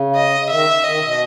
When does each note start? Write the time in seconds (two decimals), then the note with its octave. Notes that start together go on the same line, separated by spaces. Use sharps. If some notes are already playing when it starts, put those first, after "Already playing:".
Already playing: C#3
0.16 D#5
0.40 C#3
0.50 D#3 E5
0.84 D#3 D#5
0.97 C#3
1.02 B2